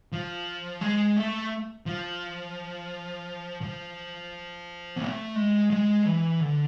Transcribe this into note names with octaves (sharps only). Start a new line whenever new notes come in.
F3
G#3
A3
F3
F3
B3
A3
G#3
G#3
E3
D3